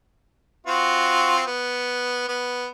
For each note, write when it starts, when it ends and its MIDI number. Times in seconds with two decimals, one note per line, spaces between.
0.67 1.44 60
0.67 1.44 65
0.67 1.44 66
1.47 2.24 59
2.28 2.67 59